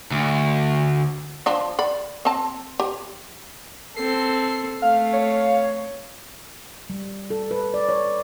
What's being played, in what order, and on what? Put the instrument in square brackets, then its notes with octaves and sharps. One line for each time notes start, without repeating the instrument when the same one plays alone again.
[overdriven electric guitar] D2
[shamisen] F3 D4
D5 B5
C4 A5
G4
[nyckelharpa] C4 A4 [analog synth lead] C7
[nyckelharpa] A3 [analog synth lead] F5
[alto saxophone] C#5
[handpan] G3
A4
B4
D5
C#5